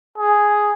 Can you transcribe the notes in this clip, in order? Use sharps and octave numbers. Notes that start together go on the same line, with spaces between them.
G#4